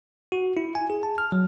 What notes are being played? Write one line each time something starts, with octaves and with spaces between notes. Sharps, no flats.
F#4
E4
G#5
G#4
A5
F6
F#3